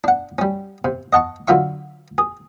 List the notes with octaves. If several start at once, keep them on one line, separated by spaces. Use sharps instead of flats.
D4 F#5
G3 C#4
C3
D#5 F#5 A5 C#6
D3 F#3 F4 E5 C#6
G#4